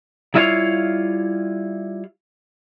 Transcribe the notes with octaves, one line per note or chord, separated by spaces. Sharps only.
G3 E4 F4 B4 C#5 F5